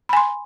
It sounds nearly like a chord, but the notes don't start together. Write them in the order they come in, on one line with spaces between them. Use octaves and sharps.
B5 G#5 C6